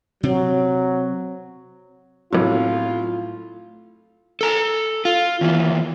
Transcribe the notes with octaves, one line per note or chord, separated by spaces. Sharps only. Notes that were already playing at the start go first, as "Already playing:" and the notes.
C3 F#3 C4
B1 A2 C3 F#3 F4
A4 A#5
F4
D#2 E3